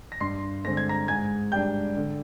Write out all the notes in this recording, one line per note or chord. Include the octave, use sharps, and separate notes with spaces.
A#6
G2 C6 C7
D3 G#3 C4 A#6
G#6
A#5 A#6
G#2 G#5 G#6
G3 D4 G5 G6
D3